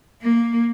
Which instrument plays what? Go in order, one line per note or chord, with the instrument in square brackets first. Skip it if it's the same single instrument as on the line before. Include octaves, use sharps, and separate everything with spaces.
[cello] A#3